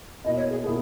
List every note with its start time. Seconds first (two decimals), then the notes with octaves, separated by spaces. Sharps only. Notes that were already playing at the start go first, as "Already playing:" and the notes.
0.25 B2 A#3 E4 D#5
0.38 C#5
0.51 G#4
0.64 B2 A#3 E4 G#4